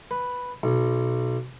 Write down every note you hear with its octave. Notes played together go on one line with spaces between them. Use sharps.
B4
B1